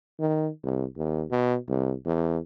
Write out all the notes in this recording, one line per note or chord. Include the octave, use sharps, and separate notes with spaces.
D#3
C2
D#2
B2
C2
E2